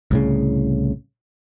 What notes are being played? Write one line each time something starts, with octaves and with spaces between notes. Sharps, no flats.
C2 A2 C#3